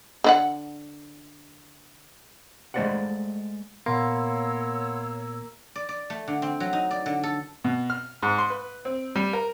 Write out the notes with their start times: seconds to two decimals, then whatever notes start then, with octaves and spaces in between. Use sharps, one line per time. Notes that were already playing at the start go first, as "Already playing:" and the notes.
0.24 D3 E4 F#5
2.74 G#3 A3 C5 D5 F5 F#5
3.86 A#2 A#3 B3 C#5 F#5 B5 C6 E6
5.75 D5
5.89 D5
6.10 A3
6.28 D3
6.42 C4
6.60 F#3
6.73 D#4
6.91 D5
7.06 D3
7.23 A4
7.64 B2
7.90 F6
8.23 G#2
8.39 C6
8.50 B4
8.85 C4
9.16 G3
9.33 A#4